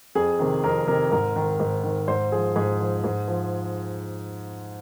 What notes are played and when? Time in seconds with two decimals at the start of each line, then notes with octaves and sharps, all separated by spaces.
0.15 F2 G#4
0.39 C3 D#3
0.64 F2 A#4
0.87 C3 D#3 A#4
1.12 G#2 A#4
1.36 D#3
1.60 G#2
1.84 D#3
2.08 G#2 C5
2.32 F3 G#4
2.56 G#2 G#4
2.80 F3
3.04 G#2
3.28 F3